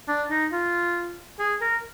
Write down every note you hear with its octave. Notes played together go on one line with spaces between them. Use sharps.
D4
D#4
F4
G#4
A#4